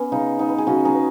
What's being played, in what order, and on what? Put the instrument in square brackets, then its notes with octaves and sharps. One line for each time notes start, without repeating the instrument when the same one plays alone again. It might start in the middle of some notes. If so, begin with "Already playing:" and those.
Already playing: [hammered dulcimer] B3 C#4
C#3 D#4
B3 D#4
B4
G#4
C#3 C#4 F#4
D#4 G#4
B3